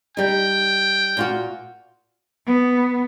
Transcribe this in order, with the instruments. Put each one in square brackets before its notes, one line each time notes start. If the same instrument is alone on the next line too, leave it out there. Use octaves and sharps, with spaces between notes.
[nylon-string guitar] G3 D#4 [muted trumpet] G5
[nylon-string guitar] A#2 F4 F#4
[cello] B3